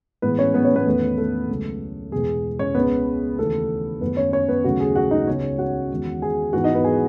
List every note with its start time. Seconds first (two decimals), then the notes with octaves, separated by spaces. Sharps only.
0.22 A2 E3 G#3 B3 B4
0.38 C#4 C#5
0.54 B3 B4
0.64 C#4 C#5
0.75 B3 B4
0.86 E2 D#3 A3
1.18 A3 A4
1.49 C#2 C#3 F#3
2.12 E2 B2 G#3 B3 G#4
2.59 C#4 C#5
2.75 C#2 C#3 G#3 B3 B4
3.38 D#2 C#3 E3 A3 B3 A4
4.01 F#2 D#3 A3 B3 B4
4.17 C#4 C#5
4.32 C#4 C#5
4.48 B3 B4
4.64 D#2 C#3 F#3 A3 F#4
4.80 G#4
4.96 F#4 F#5
5.11 D#4 D#5
5.27 C#2 C#3 G#3 B3 C#4 C#5
5.59 F#4 F#5
5.90 E2 D#3 G#3
6.22 G#4 G#5
6.53 G#2 E3 G#3 B3 F#4 F#5
6.64 D#4 D#5
6.74 B3 B4
6.84 G#4 G#5